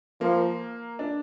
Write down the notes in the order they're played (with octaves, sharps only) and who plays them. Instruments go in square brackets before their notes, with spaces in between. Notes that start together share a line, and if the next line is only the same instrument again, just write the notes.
[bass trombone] F3 [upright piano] A#3
[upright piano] D4